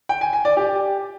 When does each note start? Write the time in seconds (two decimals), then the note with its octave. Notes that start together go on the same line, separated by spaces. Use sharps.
0.09 G5
0.21 G#5
0.33 G#5
0.45 D5
0.57 G4